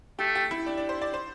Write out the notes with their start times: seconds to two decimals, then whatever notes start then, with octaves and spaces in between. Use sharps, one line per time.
0.19 A3 G4
0.35 G4
0.51 E4
0.66 D4
0.77 D4
0.89 C5
1.02 D5
1.14 C5